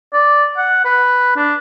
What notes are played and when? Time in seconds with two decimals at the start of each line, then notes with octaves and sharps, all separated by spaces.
0.13 D5
0.57 F#5
0.85 B4
1.36 D4